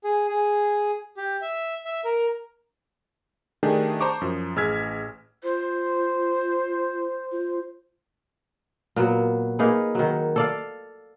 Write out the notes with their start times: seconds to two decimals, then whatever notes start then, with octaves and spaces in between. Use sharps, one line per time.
0.04 G#4
0.28 G#4
1.17 G4
1.42 E5
1.85 E5
2.05 A#4
3.63 D#3 A3 D4 G4 G#4
4.01 C5 A5 A#5 C#6 D6
4.21 F#2 F3
4.56 A1 G#4 E6 F6 G#6 B6
5.43 F4 C5
7.32 F4
8.96 A#2 F#3 B3
9.59 A#3 D#4 G#4 B4
9.95 D#3 F#3
10.36 A4 D5 F5